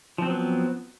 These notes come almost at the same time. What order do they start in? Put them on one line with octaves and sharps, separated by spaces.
F3 C4 F#3 B3